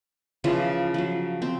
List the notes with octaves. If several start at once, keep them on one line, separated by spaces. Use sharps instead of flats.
C#3 E3 F3 F4
F3 F#3
C4